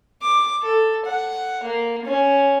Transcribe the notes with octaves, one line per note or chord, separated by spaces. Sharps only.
D6
A4
F#5
A#3
C#4